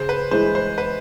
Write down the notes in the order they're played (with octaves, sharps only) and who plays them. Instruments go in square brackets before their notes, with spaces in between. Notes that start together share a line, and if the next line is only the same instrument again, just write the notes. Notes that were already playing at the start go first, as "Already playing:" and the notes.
Already playing: [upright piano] C#3 [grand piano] C5
[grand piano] B4
[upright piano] E3 G#3 [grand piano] C5
[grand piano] C5
B4